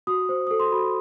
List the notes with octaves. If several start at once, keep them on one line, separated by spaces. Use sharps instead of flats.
F#4 D#6
C5
A4 D#6
C6
F#4 B5